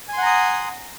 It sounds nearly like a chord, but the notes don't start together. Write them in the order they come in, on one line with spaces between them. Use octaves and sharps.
G#5 C6 F#5 A#5 D#6